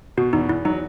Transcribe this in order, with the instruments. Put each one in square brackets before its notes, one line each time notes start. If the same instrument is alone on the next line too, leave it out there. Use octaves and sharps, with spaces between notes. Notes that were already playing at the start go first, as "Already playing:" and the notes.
[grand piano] B2 [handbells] F#4
[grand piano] E2 [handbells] D#4
[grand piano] E2 [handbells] E4
[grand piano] F#3 [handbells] D#4